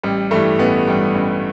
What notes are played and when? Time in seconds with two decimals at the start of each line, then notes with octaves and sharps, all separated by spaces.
0.03 A1 G3
0.31 G2 E3 G3 A3
0.59 A1 B3
0.87 G2 E3 G3
1.15 A1